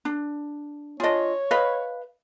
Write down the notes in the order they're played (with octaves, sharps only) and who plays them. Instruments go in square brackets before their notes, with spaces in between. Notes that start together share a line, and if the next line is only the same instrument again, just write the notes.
[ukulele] D4
[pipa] D4 G#4 [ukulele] F4 D#5 [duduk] C#5
[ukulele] B4 [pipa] D#5 F5 B5